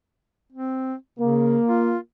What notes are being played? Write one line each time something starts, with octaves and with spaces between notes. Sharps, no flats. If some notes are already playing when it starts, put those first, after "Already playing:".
C4
C#3 A#3
F4